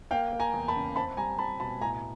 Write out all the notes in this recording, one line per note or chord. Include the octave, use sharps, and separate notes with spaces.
A#3 F5 G5
A#3
G#5 A#5
E2
A5 B5
C#3
C4 A5 B5
G3 G#5 A#5
C4 A5 B5
B2 A5 B5
A2 G#5 A#5